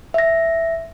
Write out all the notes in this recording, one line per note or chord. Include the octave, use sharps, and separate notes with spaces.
E5 A#6